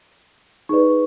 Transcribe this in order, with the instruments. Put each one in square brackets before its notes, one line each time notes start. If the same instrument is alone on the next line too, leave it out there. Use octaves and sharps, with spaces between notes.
[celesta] D#4 G#4 B4 D5 C#6